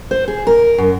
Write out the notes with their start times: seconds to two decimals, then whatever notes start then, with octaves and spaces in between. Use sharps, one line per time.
0.11 C5
0.28 G#4
0.47 A#4
0.78 F#2